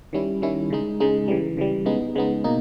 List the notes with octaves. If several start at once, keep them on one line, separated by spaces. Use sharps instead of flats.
D#3 G3 C#4 E4
D#3 G3 C#4 E4
C#3 G#3 D#4
C#3 G#3 D#4
C#3 E3 G3
C#3 E3 G3
C#3 G#3 B3 D#4
C#3 G#3 B3 D#4
B2 A#3 D#4